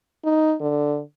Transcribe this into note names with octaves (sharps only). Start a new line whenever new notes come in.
D#4
D3